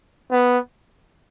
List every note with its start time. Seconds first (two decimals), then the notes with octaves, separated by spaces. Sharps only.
0.31 B3